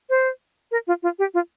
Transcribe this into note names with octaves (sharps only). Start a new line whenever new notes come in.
C5
A#4
F4
F4
G4
F4